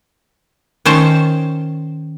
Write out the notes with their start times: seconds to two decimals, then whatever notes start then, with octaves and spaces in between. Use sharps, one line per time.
0.85 D#3 C#4 C5 A5